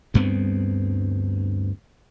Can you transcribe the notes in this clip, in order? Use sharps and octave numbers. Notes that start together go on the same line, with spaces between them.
D2 G2 B3 C4